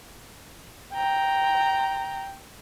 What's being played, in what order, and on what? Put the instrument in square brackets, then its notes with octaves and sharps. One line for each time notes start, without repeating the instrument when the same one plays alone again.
[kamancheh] G5 A#5